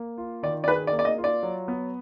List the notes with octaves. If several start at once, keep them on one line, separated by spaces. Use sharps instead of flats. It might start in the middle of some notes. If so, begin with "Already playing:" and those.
Already playing: A#3
F4
D#3 D5
D5
G#4 B4
D5
A#3
D5
D#5
F4
D5
F#3
B3